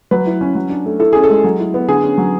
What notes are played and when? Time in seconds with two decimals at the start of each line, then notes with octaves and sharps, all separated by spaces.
0.11 F#3 B4
0.27 E4
0.41 C#4
0.55 F#3
0.70 D4
0.86 A3
0.99 E4 A4
1.13 C#4 G#4
1.23 A4
1.30 G#3
1.44 F#3
1.60 E4
1.74 B3
1.88 D3 G#4
2.03 C#4
2.18 F#3